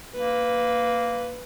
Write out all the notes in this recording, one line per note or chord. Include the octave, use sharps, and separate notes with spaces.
A#3 B4